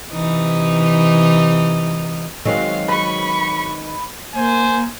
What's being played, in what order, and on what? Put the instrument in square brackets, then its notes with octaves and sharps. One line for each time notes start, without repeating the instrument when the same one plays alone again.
[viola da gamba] C3 E3 D#4
[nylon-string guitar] D#3 G#3 C4 [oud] F#3 [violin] F5
[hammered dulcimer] B4 [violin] B5 C#6
[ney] A#3 [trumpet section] C5 G#5